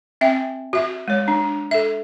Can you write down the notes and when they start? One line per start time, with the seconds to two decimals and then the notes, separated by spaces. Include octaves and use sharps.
0.21 C4 E5 G5
0.73 F#4 E5
1.08 G#3 C#5
1.28 D4
1.71 A4 E5